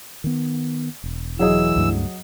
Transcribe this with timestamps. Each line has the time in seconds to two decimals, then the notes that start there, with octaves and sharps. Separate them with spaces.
0.24 D#3 B3
1.04 E1
1.39 E3 F#3 G#4 D#5 E6
1.76 C#2 G2 A3